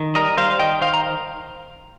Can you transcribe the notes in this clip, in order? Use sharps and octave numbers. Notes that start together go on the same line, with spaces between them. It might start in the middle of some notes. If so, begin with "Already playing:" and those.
Already playing: D#3
G3 A#4 D#5
G3 C5 F5
D#3 D#5 G5
D#3 C5 F5
A#5